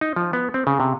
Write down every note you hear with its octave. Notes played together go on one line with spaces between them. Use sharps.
D#4
F3
B3
C4
C#3
C3